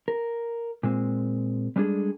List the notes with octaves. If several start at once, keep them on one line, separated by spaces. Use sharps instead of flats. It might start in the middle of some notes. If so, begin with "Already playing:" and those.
A#4
A#2 G#3 C4
G3 G#3 B3 D4 G#4 A4